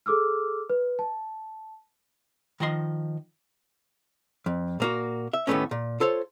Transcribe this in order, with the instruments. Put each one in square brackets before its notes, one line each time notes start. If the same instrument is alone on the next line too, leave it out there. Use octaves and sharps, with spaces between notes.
[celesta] G#4 A4 D6 E6 F6
B4
A5
[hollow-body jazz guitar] D#3 F3 D#5 C6
F2
A#2 A#3 F#4
E5
D#2 A2 D3 A3 B3 C#4
A#2
F4 A4 C5 C#5